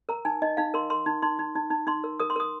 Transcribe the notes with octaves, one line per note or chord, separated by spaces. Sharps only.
A#4 A#5
D#4 G#5
D#4 D#5
D#4 F5
A#4 C6
A#4 C6
D#4
D#4 C6
D#4
D#4
D#4
D#4 C6
A#4
A#4 D#6
C6
A#4 D#6